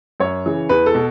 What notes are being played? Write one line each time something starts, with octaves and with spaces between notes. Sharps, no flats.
F#2 C#5
C#3 E3
E2 B4
A4
B2